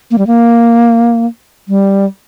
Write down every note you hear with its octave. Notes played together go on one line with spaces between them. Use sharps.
A#3
G3
A#3
G3